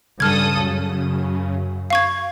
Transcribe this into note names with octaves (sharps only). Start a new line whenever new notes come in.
G2 C#3 A4 D#6 F6 G#6
F#2
F5 C#6 G#6